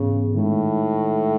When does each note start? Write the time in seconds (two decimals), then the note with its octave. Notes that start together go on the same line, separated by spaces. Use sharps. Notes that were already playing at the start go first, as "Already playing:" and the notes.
Already playing: G#2 C#3 E3 B3
0.34 A2 D#3 G#3 D#4